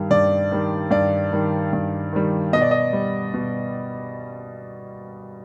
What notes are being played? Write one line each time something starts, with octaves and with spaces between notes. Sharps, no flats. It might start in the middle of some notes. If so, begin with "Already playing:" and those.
Already playing: G2 D#3 G3
G2 D5
D#3 G3
G2 D5
D#3 G3
G2
D#3 G3
B2 D#5
D5
D#5
G3
B2